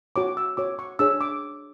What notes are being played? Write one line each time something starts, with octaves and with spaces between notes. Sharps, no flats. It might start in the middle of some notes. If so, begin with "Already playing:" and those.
F#4 C#5 D6
E6
F#4 C#5 D6
C#6
D4 G#4 C#5 E6
D6